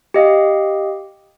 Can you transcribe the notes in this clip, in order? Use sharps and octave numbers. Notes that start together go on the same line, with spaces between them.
G4 D#5 F5